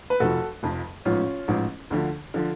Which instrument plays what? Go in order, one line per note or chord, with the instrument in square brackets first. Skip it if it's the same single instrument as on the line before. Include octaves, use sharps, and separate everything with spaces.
[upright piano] B4
F1 F2 F3 F#4 A4
F1 F2 F3
A1 G#2 F3 C#4 F4
A1 G#2 F3
D2 D3 F3
D3 F3